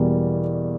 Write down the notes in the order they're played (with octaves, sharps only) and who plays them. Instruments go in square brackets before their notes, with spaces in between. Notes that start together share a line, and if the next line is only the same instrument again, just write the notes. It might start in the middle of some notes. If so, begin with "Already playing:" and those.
Already playing: [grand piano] E2 B2 G3 A#3